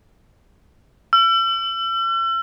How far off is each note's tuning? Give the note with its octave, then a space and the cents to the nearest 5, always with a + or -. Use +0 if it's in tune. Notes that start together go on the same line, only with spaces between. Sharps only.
E6 +40